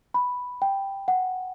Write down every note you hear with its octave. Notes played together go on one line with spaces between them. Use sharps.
B5
G5
F#5